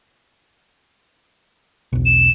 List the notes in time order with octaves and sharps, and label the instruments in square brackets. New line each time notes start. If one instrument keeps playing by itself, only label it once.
[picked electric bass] E1 B1
[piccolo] E7